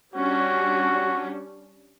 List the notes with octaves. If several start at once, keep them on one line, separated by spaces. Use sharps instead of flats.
G3 C#4 D4 F#4